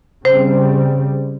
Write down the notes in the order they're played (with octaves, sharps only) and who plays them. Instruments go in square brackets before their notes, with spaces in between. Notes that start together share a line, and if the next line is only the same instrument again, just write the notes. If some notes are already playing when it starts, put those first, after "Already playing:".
[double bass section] C#3 G3 C4 [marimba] C5